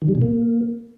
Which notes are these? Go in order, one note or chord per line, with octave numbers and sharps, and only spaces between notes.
D#3
G3
B2
A#3